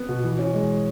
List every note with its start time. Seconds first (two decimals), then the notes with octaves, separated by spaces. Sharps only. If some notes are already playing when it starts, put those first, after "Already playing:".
Already playing: B3
0.09 B2
0.24 E3
0.39 C#4
0.54 G#3